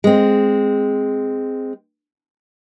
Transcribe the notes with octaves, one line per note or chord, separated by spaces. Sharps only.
G#3 C4